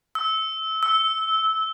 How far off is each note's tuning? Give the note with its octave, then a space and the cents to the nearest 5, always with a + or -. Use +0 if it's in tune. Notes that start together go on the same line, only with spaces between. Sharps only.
E6 -25
E6 -15